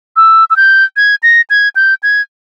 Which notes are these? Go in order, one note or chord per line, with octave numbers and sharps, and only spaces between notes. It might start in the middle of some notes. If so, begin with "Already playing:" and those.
E6
E6
G6
G#6
A#6
G#6
G6
G#6